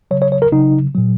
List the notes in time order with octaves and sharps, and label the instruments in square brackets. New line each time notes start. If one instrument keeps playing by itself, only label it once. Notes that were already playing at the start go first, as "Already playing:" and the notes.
[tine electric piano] C#3 F#3 C#5
C#5
C#5
A#4
C#3 F#3 D#4
A#2 F#3